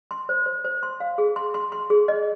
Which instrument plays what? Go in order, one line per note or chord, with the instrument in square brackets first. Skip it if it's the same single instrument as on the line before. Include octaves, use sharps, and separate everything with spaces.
[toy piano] C6
C5
C5
C5
C6
F5
G#4
C6
C6
C6
G#4
D#5